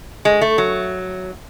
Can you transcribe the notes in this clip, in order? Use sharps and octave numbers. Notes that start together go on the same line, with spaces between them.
G#3
A3
F#3